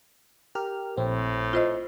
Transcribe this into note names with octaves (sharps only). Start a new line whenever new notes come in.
G4 A#4 F6
A#1 A2 C4
F4 C5 D#5